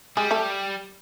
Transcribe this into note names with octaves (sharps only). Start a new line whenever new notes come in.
G3 G#3 G#4
A3 A4